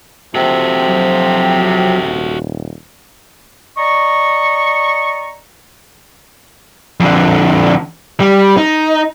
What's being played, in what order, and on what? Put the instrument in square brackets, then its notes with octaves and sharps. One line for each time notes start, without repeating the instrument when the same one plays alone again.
[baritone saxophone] C3 [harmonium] F3 C4 [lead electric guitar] F#4 A4
[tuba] F#3
D#1
[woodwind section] D5 D#5 A#5 C#6
[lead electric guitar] F2 D3
G3
D#4